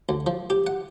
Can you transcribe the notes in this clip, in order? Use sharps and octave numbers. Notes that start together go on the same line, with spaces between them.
D2
F3
G4
F#5